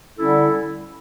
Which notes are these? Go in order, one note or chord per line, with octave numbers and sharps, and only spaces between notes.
D3 G3 C#4 E4 A4